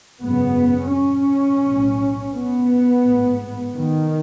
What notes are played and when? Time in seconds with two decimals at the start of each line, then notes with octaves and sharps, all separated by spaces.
0.21 G#1 F#2 C#3 B3
0.92 C#4
1.63 B1 A2
2.33 B3
3.04 A1 G#2
3.75 D#3